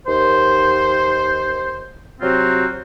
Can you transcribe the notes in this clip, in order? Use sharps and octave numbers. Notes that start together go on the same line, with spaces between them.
D#2 C5
C3 F#3 C4 F4 F#4